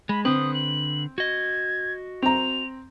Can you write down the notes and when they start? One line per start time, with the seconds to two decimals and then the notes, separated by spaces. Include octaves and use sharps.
0.09 G#3 B5
0.25 D3 C4 B4 D#6
0.54 F#7
1.18 F#4 D#5 G#6
2.22 C4 A#5 F7